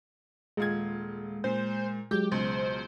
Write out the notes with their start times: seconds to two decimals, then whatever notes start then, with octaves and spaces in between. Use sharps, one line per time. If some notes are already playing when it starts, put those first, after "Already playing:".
0.57 D#1 G#3 F4 G#6
1.44 A#2 C5
2.11 F#3 G#3 G4 G6
2.32 C#2 B2 C5